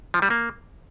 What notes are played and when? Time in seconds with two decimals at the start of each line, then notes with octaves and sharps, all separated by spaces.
0.14 F3
0.22 G3
0.30 A#3